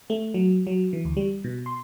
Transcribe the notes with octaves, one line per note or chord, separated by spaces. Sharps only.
A3
F#3
F#3
E3
D2
G3
B2
C6